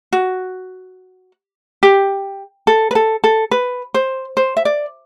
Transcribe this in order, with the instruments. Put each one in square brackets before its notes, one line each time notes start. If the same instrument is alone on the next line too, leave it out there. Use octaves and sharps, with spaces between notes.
[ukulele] F#4
G4
A4
B4
A4
A4
B4
C5
C5
E5
D5